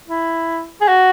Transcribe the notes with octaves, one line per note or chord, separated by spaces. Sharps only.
E4
G#4
F#4